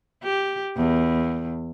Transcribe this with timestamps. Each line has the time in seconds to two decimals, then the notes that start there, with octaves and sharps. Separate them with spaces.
0.23 G4
0.77 E2